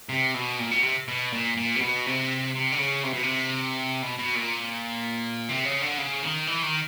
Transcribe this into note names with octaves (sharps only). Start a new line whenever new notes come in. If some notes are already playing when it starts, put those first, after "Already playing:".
C3
B2
A#2
B2
C3
B2
A#2
A#2
C3
B2
C3
C3
D3
C#3
C3
B2
C3
B2
B2
A#2
C3
C#3
D3
C#3
D#3
E3
D#3